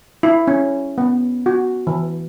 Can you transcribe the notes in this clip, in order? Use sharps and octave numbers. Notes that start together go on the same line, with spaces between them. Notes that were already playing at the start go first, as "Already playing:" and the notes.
E4
C#4
B3
F#4
E3